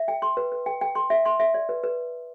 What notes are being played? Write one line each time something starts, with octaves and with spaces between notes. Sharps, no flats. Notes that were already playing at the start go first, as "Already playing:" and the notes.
Already playing: E5
G5
C6
B4
B4
G5
G5
C6
E5
C6
E5
D5
B4
B4